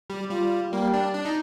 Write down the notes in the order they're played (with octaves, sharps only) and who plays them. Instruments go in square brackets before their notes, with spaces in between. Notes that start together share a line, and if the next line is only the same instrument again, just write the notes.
[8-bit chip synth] G3
[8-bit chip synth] G3 [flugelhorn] F4
[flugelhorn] G3 [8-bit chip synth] A#3
[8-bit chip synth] D4
D4
D#4